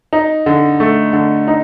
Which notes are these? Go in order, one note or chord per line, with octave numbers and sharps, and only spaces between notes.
D#4
D3
A3
D3
D#4